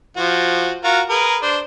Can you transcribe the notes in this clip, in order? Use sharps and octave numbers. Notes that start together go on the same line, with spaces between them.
F3 F#4
F4 F#4 A#4
G#4 A#4 B4
D4 C5